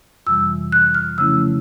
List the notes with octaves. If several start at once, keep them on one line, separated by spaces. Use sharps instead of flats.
F2 C3 E3 G3 E6
F#6
F6
C#3 F3 A3 C#4 E4 E6